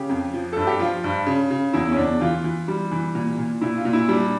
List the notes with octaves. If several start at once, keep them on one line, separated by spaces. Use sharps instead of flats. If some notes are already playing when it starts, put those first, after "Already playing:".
Already playing: C#3 G4
F2
F3
G2 A4
G4
F3 F4
G2
C#3
C#3
E2 E4
C#4
E2 D4
E3 F4
E3
G3
E3
A#2
A#2
A#2 E4
F4
A#2
E4
G3 D4